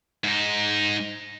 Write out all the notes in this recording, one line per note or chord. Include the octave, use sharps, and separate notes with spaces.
G#2 D#4